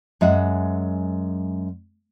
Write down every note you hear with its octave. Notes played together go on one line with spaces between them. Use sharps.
F#2 G#3 E5 F#5